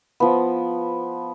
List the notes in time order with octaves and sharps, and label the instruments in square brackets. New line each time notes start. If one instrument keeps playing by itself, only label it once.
[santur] F3 B3